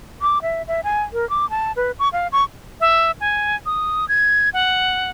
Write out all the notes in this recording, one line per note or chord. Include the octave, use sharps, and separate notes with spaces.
D6
E5
E5
G#5
A#4
D6
A5
B4
C#6
F5
C#6
E5
G#5
D#6
G#6
F#5